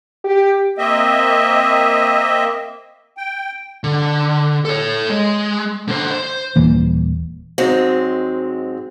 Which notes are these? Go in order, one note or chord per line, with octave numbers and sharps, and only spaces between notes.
G4
A#3 C4 D#5 E5
G5
D3
A4 C#5
G#3
D3 C5
C5
D#1 E3 A#3
G#2 F#3 G#3 C4